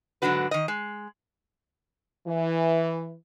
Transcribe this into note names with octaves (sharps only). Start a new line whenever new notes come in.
G#2 D3 F#3 D4 F#4 B4
D#3 D#5
G#3
E3